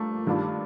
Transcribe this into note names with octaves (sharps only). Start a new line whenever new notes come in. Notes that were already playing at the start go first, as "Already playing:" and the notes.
Already playing: G2 F3 A3 A#3
G2 D#3 G3 D4 F4